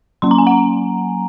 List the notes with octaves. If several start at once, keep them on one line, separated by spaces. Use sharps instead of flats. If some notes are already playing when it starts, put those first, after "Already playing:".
F#3 A#3 C#4 C6
A#5
G#5
F#5 A#5